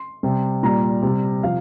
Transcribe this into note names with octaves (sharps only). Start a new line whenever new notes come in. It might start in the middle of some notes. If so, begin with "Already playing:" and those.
Already playing: C6
C3 G3
A#2 G3 A#5
C3 G3
C3 F3 F5